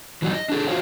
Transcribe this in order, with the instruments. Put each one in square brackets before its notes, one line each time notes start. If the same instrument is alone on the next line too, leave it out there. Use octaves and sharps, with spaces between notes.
[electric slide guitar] E3 F#3 G3 D#4
D#5
D4 G#4 A4
D#4 F4 F#4 C5 C#5 F5